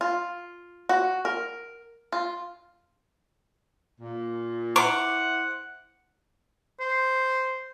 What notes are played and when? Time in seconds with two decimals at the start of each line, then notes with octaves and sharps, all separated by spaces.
0.01 F4
0.89 F#4
1.25 A#4
2.12 F4
4.00 A#2
4.76 E4 C5 F#5 D6
6.80 C5